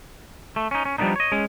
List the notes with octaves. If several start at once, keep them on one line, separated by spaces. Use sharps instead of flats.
A3
C#4 D#4
C#4
F3 G3 A#3 B3 D4 D#4
C#5 D#5
G#3 C#4